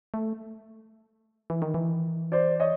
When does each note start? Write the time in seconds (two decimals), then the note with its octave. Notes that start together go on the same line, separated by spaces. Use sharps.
0.14 A3
1.50 E3
1.62 D#3
1.74 E3
2.32 C5 D5
2.60 C#5 D#5